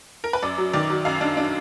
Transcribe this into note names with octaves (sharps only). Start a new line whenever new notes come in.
A#4
B4
F#2 D5
F#3
D#3 D5
F#3
F#2 F5
D4
D4